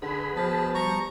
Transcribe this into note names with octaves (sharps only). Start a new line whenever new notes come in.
D3 G#4 B4 B5
B2 F3 A5
G3 A#5 C#6